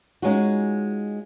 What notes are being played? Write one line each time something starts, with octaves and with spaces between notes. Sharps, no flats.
G#3 C#4 D#4 F4 F#4